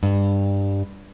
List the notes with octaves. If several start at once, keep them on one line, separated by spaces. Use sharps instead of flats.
G2